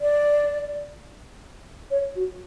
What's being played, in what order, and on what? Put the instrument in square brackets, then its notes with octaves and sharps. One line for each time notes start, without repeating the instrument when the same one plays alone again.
[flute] D5
C#5
F#4